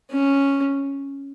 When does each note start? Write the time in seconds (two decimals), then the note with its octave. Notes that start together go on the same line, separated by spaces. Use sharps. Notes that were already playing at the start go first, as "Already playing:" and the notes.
0.11 C#4